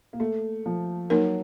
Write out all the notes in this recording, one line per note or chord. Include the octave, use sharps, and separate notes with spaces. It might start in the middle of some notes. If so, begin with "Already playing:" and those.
A#3
A3
F3
F#3 A#3 D#4 A#4